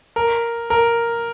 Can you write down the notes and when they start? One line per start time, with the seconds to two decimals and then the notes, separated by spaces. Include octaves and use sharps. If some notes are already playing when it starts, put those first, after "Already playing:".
0.16 A#4
0.70 A#4